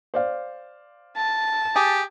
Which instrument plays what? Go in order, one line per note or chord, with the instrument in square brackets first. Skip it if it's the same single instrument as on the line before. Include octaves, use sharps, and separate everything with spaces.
[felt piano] C5 D5 F5
[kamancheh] A5
[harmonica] G4 [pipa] G#4